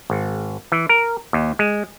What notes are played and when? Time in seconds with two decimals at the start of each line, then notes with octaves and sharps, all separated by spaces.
0.10 G#1
0.72 E3
0.89 A#4
1.33 D#2
1.59 G#3